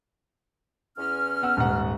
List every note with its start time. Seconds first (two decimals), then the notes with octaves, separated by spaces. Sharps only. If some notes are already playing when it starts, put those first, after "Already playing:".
0.97 E2 C#4 F6
1.42 B3 F#5 E6
1.57 D#1 G#2 F#5